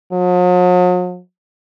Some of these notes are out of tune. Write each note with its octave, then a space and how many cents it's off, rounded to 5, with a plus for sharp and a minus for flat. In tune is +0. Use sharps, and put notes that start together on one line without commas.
F#3 -45